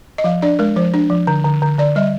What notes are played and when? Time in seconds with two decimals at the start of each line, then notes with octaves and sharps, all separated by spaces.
0.18 D#5
0.24 F3 F5
0.42 D4 D5
0.59 G#3 A#4
0.76 F3 C5
0.94 D4
1.10 F3
1.27 D3
1.44 D3
1.62 D3
1.78 D3 D5
1.96 G3 D#5